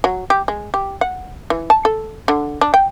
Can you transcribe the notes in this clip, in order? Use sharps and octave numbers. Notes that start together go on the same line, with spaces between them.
F#3
G4
G#3
G4
F#5
E3
A5
A4
D3
D4
G5